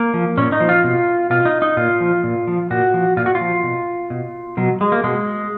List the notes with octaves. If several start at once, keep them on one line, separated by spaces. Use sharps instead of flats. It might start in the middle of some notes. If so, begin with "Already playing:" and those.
Already playing: A#3
F3
A#2 C#4
D#4
F3
F4
B2
B2 F4
D#4
D#4
A#2 F4
F3
A#2
F3
A#2 F#4
F3
A#2 F4
F#4
F4
F3
B2
B2
B2 F#3
G#3
A#3
B2 G#3